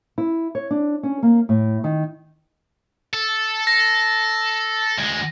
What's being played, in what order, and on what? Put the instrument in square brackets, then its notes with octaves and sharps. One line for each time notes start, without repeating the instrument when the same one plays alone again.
[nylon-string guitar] E4
C#5
D4
C#4
A#3
A2
D#3
[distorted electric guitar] A4
[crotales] A#6
[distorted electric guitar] D2 G#3